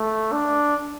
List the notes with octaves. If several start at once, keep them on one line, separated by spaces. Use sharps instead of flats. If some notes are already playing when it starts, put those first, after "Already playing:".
Already playing: A3
D4